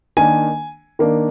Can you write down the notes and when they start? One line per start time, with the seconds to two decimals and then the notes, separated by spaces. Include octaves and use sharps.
0.17 D#3 A#3 D4 G#5
0.99 D#3 A#3 D4